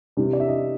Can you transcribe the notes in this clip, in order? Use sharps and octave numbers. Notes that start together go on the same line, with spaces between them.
C3 E3 G3
D5
E5
D#5